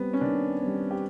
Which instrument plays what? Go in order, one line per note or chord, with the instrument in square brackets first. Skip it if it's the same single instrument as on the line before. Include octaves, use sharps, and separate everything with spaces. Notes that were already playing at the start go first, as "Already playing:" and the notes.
Already playing: [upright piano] G3 C4 [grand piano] B3
[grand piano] C#4
[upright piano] D#3 [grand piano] D4
[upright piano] G3 C4
[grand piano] G4